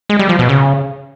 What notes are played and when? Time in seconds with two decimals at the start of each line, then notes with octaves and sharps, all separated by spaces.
0.10 G#3
0.19 G3
0.29 F3
0.39 B2
0.49 C#3